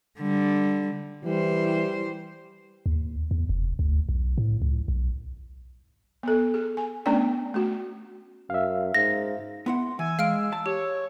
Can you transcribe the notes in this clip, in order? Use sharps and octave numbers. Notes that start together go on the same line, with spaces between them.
D3 G3
E3 G3 C5
D#2
E2
F1
D2
B1
A2
C#2
B1
B3 A4
G#4
G#5
A3 B3 C#4 D4 D5 G5
A3 F#4
F#2 E5 F5
G#2 A#6
B3 E4 F#5 C6
E3 G#5 E6
G#3 F5 F6 D7
A5
G4 C#5